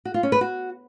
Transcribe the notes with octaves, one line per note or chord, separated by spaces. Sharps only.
F#4
F4
C#4
B4
F#4